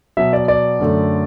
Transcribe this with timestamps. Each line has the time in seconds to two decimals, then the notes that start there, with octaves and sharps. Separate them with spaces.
0.17 B2 F#3 B3 E5
0.33 D5
0.48 D5
0.80 F#2 D3 A3